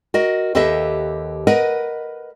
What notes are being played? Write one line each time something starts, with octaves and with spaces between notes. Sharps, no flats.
F#4 A#4 D#5
D#2 G4 A4 B4 D#5 E5
A#4 B4 D#5 F#5